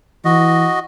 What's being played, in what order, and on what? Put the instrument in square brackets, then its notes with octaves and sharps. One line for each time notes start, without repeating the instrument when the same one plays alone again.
[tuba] E3 [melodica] F#4 D#5